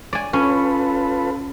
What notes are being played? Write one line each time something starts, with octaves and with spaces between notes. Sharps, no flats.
D5 G#5
C#4 F4 A4 B4